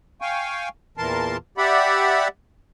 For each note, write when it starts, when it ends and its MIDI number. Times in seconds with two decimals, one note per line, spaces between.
0.21 0.69 77
0.21 0.69 79
0.21 0.69 80
0.21 0.69 85
0.97 1.37 40
0.97 1.37 46
0.97 1.37 52
0.97 1.37 70
0.97 1.37 81
0.97 1.37 84
1.58 2.28 67
1.58 2.28 74
1.58 2.28 76
1.58 2.28 78
1.58 2.28 83